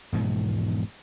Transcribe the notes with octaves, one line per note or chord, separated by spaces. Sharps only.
E1 G#2 B2 F3